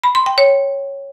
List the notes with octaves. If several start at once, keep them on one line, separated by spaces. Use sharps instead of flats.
B5
C6
G5
C#5